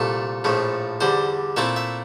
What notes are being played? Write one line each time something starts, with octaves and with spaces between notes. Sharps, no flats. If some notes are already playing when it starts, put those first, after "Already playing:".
Already playing: C2 A#2 A3 A4
A#1 A2 F3 A3
E2 D3 G3 C5
A#2 A3 C4 E4 E5
E5